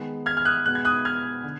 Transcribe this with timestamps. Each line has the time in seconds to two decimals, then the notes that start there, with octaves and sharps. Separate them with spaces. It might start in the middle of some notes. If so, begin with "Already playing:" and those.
Already playing: D#3 G#3 B3
0.26 F6 G#6
0.37 F6
0.45 D#6 F#6
0.65 B2 G#3 B3 F#6
0.75 G#6
0.85 D#6 F#6
1.05 F6 G#6
1.44 D3